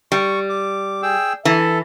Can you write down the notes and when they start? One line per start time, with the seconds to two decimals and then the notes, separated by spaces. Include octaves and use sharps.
0.12 G3 C#6
0.49 D6
1.02 G#4 G5 E6
1.45 E3 A4